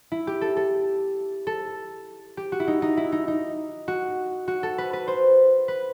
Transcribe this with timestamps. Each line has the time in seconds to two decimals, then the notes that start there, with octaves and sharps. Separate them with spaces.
0.12 E4
0.27 G4
0.41 A4
0.57 A4
1.47 A4
2.37 G4
2.52 F#4
2.60 E4
2.68 D#4
2.82 D#4
2.97 E4
3.12 D#4
3.28 D#4
3.88 F#4
4.48 F#4
4.63 A4
4.78 B4
4.93 B4
5.08 C5
5.68 B4